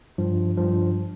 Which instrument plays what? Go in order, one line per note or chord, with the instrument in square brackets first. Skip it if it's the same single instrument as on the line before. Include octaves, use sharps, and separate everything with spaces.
[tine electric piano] G2 F3
G2 F3